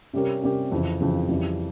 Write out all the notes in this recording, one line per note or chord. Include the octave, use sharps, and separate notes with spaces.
C3 G3 C#4 G4 A#4
C3 G3 C#4 G4 A#4
F2 C#3 E3
F2 C#3 E3
F2 C#3 E3 G3